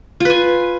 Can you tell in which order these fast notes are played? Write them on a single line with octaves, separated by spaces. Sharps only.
F4 B4 G#5